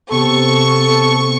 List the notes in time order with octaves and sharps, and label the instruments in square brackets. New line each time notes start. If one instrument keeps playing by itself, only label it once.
[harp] C3 [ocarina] B3 [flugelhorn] A4 [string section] C#6